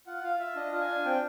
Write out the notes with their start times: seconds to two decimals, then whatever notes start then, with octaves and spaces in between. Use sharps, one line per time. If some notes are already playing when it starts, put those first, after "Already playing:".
0.07 F4 F#5
0.23 F4 F5
0.40 F4 E5
0.56 D4 D#5
0.73 F4
0.80 G#5
0.88 D4
1.05 C4 G5